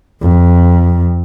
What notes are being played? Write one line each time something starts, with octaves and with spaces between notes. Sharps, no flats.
F2